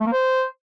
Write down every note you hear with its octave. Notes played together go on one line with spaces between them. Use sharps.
A3
A#3
C5